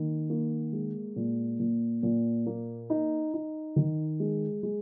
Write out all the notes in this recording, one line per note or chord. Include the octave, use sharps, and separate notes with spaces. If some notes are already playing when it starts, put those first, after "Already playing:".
Already playing: D#3 A#3
A#3
G#3
A#2
A#2
A#2
A#3
D#4
D#4
D#3
G#3
G#3